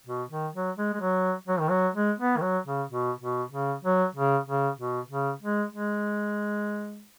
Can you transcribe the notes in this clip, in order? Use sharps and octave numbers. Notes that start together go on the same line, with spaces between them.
B2
D#3
F#3
G#3
G#3
F#3
F#3
D#3
F#3
G#3
B3
D#3
F#3
C#3
B2
B2
C#3
F#3
C#3
C#3
B2
C#3
G#3
G#3